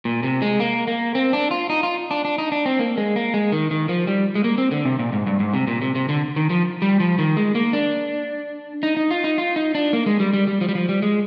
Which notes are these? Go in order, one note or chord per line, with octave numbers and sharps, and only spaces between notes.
A#2
C3
G#3
A#3
A#3
C4
D4
F4
D#4
F4
D4
D4
D#4
D4
C4
A#3
G#3
A#3
G#3
D#3
D#3
F3
G3
G#3
A#3
C4
D3
C3
A#2
G#2
G2
G#2
C3
A#2
C3
C3
D3
D#3
F3
G3
F3
D#3
G#3
A#3
D4
D#4
D#4
F4
D#4
F4
D#4
D4
A#3
G#3
G3
G3
G3
F3
G3
F3
G3
G#3